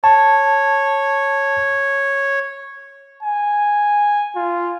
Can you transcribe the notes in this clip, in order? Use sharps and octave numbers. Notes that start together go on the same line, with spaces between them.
C#5 A5
G#5
F4